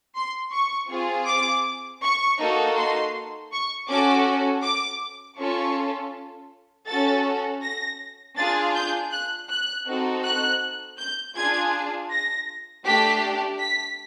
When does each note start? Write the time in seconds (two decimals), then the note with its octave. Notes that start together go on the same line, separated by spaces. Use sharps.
0.15 C6
0.53 C#6
0.90 C4 F4 G#4
1.27 D6
2.02 C#6
2.40 A#3 D#4 F#4 A4
2.77 C6
3.52 C#6
3.89 C#4 F#4 A4 D6
4.63 D6
5.38 C#4 F4 A4 C#6
6.88 C#4 F#4 A4 A6
7.63 A#6
8.37 D4 F4 G#4 A6
8.75 G6
9.12 F#6
9.49 F#6
9.87 C4 D#4 F#4 A4
10.24 F#6
10.98 G6
11.35 D4 F4 G#4 G#6
12.11 A#6
12.85 A3 D4 G4 B6
13.60 B6